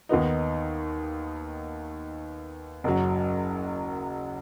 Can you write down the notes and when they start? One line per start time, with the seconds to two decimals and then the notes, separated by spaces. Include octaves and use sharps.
0.09 D#2 D#3 B3 D#4
2.84 F#1 F#2 F#3